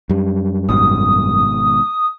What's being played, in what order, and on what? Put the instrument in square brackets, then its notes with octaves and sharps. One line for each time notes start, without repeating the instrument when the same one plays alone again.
[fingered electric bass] F#2 G3
[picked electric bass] G#1 G#2 B2 [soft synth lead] D#6